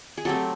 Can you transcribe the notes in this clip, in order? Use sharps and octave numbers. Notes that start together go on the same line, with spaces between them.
G#4
F#3 A3 C4 G4 A4